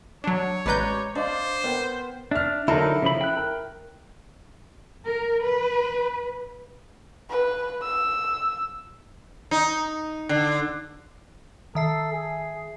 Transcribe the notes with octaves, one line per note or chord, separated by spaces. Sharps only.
F#3 D4 C#5
A1 G#3 B4 D5 A#5 B5 G6
D4 C5 D5 D#5 F5
B3 A#4 G5
D4 E5 F6
D3 F#3 D#4 E4 A4 A#4
C#3 F3 B5
G5 F#6
A#4
A#4
B4
B4
E6
D#4
D3
D#3 A4 E5 C7
G#4